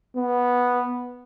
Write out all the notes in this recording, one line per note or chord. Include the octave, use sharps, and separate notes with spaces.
B3